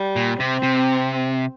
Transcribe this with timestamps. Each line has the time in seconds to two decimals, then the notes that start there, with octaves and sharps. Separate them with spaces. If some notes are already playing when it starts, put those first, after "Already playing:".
Already playing: G3
0.16 A#2
0.40 C3 C4
0.63 C3